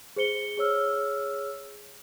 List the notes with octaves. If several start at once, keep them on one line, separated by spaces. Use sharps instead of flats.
G#4 C5 C#7 G7
G#4 C#5 E6 F6